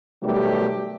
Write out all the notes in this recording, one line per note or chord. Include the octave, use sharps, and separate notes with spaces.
B2 D#3 F#3 G3 A3 G4